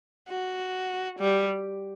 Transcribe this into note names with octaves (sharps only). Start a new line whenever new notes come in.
F#4
G3